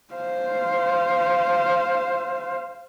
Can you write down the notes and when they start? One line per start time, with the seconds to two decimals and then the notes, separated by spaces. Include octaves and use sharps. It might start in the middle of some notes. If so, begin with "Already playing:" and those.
0.14 C5 F5